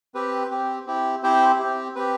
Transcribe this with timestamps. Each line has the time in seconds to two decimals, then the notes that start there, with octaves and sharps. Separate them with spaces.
0.15 C4 G4 B4
0.50 C4 G4
0.86 C4 E4 G4
1.23 C4 E4 G4 C5
1.59 C4 G4
1.95 C4 G4 B4